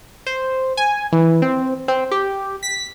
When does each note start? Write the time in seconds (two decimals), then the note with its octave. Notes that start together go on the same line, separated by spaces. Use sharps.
0.26 C5
0.77 G#5
1.12 E3
1.42 C4
1.88 C4
2.11 G4
2.63 B6